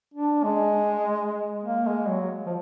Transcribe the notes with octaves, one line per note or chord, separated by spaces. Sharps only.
D4
G#3
A#3
G#3
F#3
F3